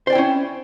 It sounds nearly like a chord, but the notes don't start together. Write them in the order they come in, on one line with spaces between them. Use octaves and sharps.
C5 D5 G5 E4 C#4